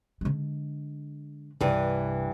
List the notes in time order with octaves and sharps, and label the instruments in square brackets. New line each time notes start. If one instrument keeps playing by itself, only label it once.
[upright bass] D3 G#3
[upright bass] C2 C3 [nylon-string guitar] G2 E3